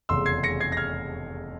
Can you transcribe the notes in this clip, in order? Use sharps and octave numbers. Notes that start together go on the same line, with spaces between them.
F1 E2 C#3 C6 E6
G#6 C7
A#6 C#7
G#6 C7
A#6
F6 G#6